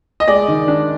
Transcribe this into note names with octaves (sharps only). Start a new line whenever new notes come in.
D#5
G#3 D5
D#3
D4